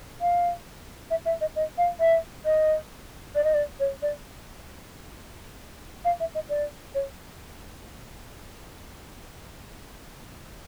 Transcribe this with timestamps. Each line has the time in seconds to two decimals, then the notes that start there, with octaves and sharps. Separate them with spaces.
0.21 F5
1.10 E5
1.25 E5
1.41 D#5
1.56 D#5
1.78 F5
2.00 E5
2.45 D#5
3.35 D5
3.44 D#5
3.54 D5
3.80 C#5
4.02 D5
6.05 F5
6.20 E5
6.35 D#5
6.49 D5
6.95 C#5